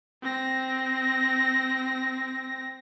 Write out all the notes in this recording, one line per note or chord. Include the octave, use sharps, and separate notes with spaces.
C4 A#6